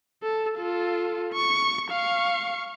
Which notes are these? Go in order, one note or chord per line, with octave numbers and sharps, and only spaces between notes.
A4
F4 A4
C#6
F5 C#6